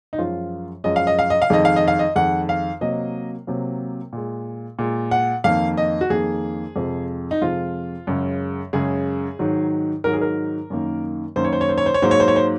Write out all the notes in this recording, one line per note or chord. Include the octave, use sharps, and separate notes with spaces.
D#4
F#2 F3 G#3 F4
F#2 F3 G#3 D#5
F5
D#5
F5
D#5
F5
F2 D#3 G#3 D#5
F5
D#5
F5
D#5
F2 D#3 G#3 F#5
F5
C3 F#3 A#3 D#5
C3 F#3 A#3
A#2 G#3
A#2 G#3
F#5
F2 D#3 A#3 F5
D#5
F#4
F2 D#3 A#3 G#4
F2 C3 F3 G#3
D#4
F2 C3 F3 G#3 F4
F#2 C#3 G#3
F#2 C#3 G#3 G#4
G#2 D#3 F#3
G#2 D#3 F#3 A#4
G#4
A#4
F#2 D#3 A#3
F#2 D#3 A#3 C5
C#5
C5
C#5
C5
C#5
C5
C#5
G#2 F#3 A#3 C5
C#5
C5
C#5
C5